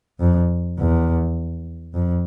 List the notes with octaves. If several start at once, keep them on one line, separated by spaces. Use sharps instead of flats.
F2
E2
F2